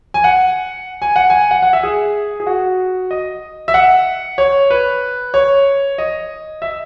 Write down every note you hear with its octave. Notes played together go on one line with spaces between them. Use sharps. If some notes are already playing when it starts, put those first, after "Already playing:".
G#5
F#5
G#5
F#5
G#5
F#5
F#5
E5
G#4
G#4
F#4
D#5
E5
F#5
C#5
B4
C#5
D#5
E5